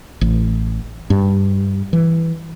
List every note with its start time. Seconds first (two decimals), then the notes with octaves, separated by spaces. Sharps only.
0.21 A1
1.10 G2
1.93 E3